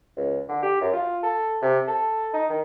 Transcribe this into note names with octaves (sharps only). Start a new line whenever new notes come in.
C#2
D3
G4
F#2
F4
A4
C3
A4
D#4
D#3